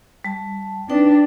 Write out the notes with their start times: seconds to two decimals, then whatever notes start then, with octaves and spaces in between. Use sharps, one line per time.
0.25 G3 A5
0.90 D4 D#4 B4 G5